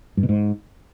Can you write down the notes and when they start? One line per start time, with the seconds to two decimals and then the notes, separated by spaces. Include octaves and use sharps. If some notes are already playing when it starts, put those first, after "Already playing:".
0.17 G2
0.23 B2
0.29 G#2